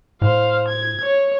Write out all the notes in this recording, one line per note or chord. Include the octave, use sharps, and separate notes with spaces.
A2 C5 F5
G#6
C#5